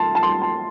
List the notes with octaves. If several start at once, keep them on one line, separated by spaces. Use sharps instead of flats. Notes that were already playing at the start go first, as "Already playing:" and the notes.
Already playing: A5 C6
A5
C6
A5